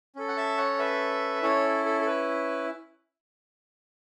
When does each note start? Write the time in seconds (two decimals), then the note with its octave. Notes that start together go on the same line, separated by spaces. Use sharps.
0.16 C#4 A4
0.28 F#5
0.37 E5 A5
0.57 C#5 F#5
0.79 B4 E5
1.43 C#4 E4 A4 C#5
1.86 A4
2.01 A4
2.06 B4